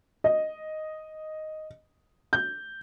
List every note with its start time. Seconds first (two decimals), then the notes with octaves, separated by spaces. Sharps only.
0.24 D#5
2.33 G6